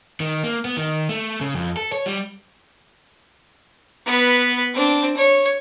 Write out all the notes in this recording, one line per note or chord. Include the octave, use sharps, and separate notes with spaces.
D#3
A#3
B3
D#3
A3
C#3
F2
A4
C#5
G3
B3 B4
C4 D4
C#5